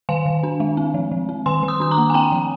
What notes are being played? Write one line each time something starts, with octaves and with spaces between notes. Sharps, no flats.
D#3 F5 G#5
D#3
D4
G#3
C4
F3
F3
C4
D#3 G#5 C6
D#3
C6 D#6
D4 D#6
A#5 D6
A#3
G#5
C4 G5 A#5
F3